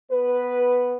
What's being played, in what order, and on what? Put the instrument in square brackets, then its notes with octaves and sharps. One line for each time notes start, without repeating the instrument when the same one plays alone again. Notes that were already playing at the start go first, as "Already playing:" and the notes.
[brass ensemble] B3 B4